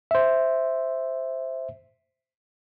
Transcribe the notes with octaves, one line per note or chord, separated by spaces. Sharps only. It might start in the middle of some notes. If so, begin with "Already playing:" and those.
C5 E5